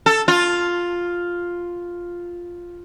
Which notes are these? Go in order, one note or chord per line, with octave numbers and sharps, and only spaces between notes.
A4
F4